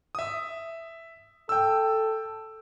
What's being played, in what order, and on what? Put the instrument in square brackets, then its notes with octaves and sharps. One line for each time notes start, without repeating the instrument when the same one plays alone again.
[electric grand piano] E5 D#6
[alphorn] A4 [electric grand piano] G5 E6